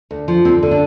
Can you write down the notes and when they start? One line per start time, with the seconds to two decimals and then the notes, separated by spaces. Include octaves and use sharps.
0.11 D2
0.28 F3
0.45 D2 C4
0.63 D3
0.71 D4